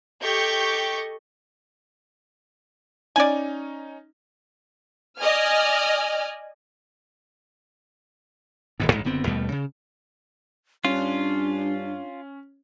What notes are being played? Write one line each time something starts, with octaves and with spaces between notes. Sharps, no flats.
G4 A4 D#5 C#6 G6
C#4 D#4 D5 G#5
D5 D#5 G#5 F6
D#1 D#2 G#2
A1 D2 G#2 G#3
F#1 D3 B3 C4
D#2 B2 G3 A3
C#3
G2 C#4 D4 F4